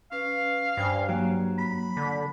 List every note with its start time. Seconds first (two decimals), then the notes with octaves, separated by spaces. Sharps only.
0.12 C#4 B4 F5
0.77 G2 C5 G5 G#5
1.09 F#3 A#3
1.58 B5
1.97 D3